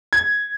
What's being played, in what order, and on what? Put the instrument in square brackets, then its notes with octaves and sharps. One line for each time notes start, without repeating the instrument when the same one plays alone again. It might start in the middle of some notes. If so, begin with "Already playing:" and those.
[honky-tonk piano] G#6